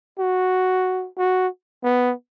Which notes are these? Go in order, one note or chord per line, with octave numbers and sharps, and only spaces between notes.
F#4
F#4
B3